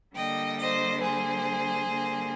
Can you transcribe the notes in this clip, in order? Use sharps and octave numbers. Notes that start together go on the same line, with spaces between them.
D3 G3 A#3 D#5 G5
C5 D#5
G#4 C5
D3 G3 A#3